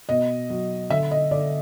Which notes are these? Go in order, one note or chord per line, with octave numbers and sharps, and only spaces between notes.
B2 D#5
F#3
D3 E5
D#5
D3 D5